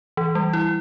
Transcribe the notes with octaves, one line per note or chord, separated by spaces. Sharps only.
E3
G3
E4